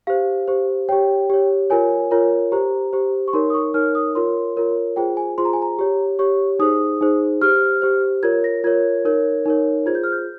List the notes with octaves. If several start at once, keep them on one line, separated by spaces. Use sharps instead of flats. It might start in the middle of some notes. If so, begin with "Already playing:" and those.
G4 C5 F5
G4 C5
G4 C#5 G5
G4 C#5
F4 A#4 C#5 G#5
F4 A#4 C#5
G4 C5 A#5
G4 C5
C#6
D#4 A#4 C#5 C6
D#6
C#6
D#4 A#4 C#5 F6
D#6
F4 A#4 C#5 C6
F4 A#4 C#5
F4 G#4 C5 G5
G#5
F4 G#4 C5 C6
A#5
G#5
A#5
G4 C#5
G4 C#5 C#6
D#4 G#4 C5 D#6
D#4 G#4 C5
G4 C5 F6
G4 C5
F4 A#4 C#5 G#6
A#6
F4 A#4 C#5 G#6
D#4 A#4 C#5
D#4 A#4 C#5
F4 G#4 C5 G#6
G6
F6
G6